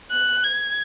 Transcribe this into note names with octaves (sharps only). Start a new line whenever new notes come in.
F#6
G#6